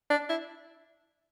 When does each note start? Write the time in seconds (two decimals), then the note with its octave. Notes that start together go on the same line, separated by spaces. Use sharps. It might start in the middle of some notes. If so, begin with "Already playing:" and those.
0.10 D4
0.29 E4